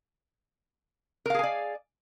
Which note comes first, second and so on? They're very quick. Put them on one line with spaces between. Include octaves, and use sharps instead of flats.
A#4 F5 G#4 G#5 D5